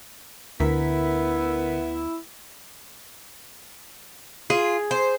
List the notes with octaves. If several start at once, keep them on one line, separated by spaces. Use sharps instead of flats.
D2 D3 B3 E4 A#4 B6
F4 G#4
C5